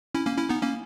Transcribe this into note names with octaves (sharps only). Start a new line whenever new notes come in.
C#4 E4
A#3 C#4
C#4 E4
B3 D#4
A#3 C#4